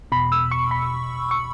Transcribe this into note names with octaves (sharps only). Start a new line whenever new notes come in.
E2 B2 B5
E6
C#6
B5
C#6